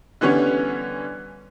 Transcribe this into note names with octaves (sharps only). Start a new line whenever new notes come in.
D3 E3 G3 B3 C#4 C#5